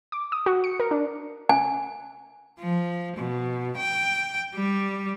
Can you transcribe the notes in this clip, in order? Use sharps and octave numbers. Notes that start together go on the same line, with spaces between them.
D6
D#6
F#4
C#7
A#4
D4
G#5
F3
B2
G5
G3